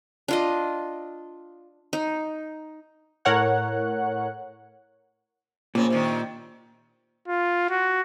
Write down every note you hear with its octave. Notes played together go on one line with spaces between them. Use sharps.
D4 F4 D#5
D#4
A2 A#4 C#5 F#5 F#6
A#2 C#3 F3 C4
C3 D#3 D4
F4
F#4